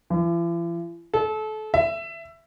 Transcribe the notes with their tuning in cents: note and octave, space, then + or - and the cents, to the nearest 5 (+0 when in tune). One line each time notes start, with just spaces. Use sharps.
E3 +45
A4 -30
E5 +15